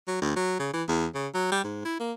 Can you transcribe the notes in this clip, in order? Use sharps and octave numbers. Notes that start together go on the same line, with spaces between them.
F#3
D2
F#3
C#3
E3
E2
C#3
F#3
G3
G#2
E4
A#3